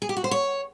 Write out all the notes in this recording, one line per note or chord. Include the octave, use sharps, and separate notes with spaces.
G#4
G4
F#4
C5
C#5